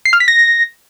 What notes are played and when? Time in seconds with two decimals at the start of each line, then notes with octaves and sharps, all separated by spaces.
0.05 C7
0.13 F6
0.20 B6
0.28 A#6